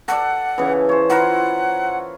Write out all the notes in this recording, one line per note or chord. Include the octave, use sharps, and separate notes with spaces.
A4 D5 F#5
C#3 E3
C5 C#5
E4 F4 A#4 F#5